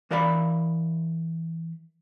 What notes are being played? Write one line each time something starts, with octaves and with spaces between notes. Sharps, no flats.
E3 A#4 D5 F5 B5